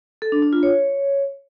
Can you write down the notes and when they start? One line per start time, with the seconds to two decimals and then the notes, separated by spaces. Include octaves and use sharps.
0.22 A4
0.32 D4
0.42 D4
0.53 F4
0.63 C#5